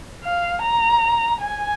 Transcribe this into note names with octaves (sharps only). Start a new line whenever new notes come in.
F5
A#5
G#5